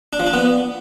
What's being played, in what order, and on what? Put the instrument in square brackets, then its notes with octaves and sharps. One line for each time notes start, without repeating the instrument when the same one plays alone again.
[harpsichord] D4
F3
D4
B3